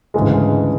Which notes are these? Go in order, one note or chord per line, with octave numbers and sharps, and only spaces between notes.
D2 G#2 C#3 E3 G#3